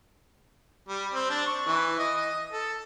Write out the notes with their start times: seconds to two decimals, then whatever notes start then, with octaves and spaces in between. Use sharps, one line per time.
0.88 G3
1.14 C4
1.30 D4
1.46 C#6
1.66 E3
1.99 D#5
2.16 D#5
2.53 A4